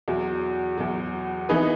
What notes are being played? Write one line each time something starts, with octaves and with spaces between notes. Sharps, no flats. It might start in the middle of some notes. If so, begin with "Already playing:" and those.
E2 B2 F#3
E2 B2 F#3
E3 B3 D#4 G#4 B4